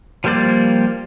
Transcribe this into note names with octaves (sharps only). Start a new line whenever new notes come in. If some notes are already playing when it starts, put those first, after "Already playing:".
F3 G3 A#3 C5 D5